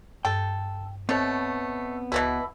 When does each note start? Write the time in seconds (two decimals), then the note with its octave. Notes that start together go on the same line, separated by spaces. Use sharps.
0.25 G2 A4 G5
1.09 B2 A3 B3 C4 C#5
2.12 C#2 B2 E3 E4 F#4